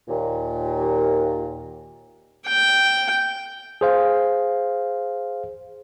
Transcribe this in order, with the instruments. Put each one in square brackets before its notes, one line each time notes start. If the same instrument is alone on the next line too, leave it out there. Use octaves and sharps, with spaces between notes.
[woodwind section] D#2 A#2
[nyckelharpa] G5
[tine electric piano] G#4 C5 F5